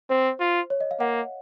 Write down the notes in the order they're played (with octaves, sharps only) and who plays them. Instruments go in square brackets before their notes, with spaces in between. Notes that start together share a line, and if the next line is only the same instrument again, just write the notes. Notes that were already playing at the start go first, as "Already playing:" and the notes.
[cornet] C4 [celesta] C5
[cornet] F4
[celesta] C#5
D#5
F5
[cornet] A#3 [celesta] F#5